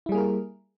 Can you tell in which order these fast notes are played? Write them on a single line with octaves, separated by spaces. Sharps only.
E4 G3 G#4 A#3 A#4